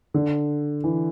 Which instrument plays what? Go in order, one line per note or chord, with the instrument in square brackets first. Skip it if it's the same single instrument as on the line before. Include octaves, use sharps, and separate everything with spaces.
[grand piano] D3
E3